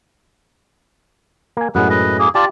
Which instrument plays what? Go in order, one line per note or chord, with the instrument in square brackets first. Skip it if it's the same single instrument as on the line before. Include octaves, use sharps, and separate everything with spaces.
[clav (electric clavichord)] A#3 G#5
[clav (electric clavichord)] F#2 A2 G#3 [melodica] B3 B4
[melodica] B4 D#5
A#3 G#4
[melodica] F4 D5 A5 [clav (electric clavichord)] G4